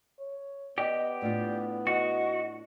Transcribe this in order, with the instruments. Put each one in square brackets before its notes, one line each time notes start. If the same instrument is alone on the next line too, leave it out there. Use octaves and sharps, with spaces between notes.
[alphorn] C#5
[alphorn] B3 [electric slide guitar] G4 [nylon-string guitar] D5 [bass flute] D#5
[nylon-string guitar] A2 D4 F4 [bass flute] D5
[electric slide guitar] F#4 [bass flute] D#5